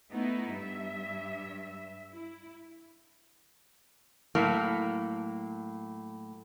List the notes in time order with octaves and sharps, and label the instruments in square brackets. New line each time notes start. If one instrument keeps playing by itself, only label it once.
[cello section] A3 B3 D#4 E4
G2 E5
E4
[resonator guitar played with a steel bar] A2 F#3 A#3